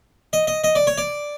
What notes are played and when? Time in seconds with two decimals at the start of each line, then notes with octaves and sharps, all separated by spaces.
0.33 D#5
0.47 D#5
0.64 D#5
0.75 D5
0.87 C#5
0.98 D5